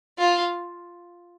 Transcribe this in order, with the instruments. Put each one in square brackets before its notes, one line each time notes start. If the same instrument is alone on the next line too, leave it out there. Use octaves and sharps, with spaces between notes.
[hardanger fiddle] F4